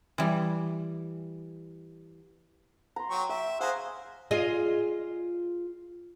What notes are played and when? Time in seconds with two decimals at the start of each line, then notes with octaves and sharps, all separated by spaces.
0.18 E3 G3
2.96 A#5 C6
3.10 F#3 G5 C#6
3.29 E5 G5
3.60 G#4 C5 F5 F#5 A#5
4.31 F4 G#4 D#5